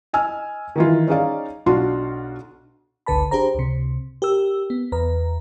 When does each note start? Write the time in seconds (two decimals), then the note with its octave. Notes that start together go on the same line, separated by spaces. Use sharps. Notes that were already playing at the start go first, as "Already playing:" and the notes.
0.13 D#5 G#5 E6 F6
0.76 D#3 E3 F4
1.07 C#4 D#4 G#4 D5 F5
1.66 B1 D4 F4 F#4 C6
3.06 G1 C#2 D3 B4 A5 B5
3.31 D4 G4 G#4 C5 A#5
3.55 C#2 C3
4.22 G4 A#4 E6
4.70 B3
4.92 E2 B4 A#5